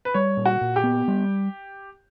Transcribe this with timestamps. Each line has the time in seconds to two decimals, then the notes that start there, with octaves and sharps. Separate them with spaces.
0.05 B4
0.14 G3 C#5
0.37 A#2
0.46 F#4
0.61 A#2
0.76 G4
0.84 B3
1.08 G3